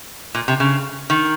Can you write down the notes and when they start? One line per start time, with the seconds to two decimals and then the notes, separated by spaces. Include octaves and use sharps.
0.35 A#2
0.48 C3
0.60 C#3
1.10 D#3